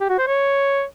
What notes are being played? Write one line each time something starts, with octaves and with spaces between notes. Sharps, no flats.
G4
F#4
C5
C#5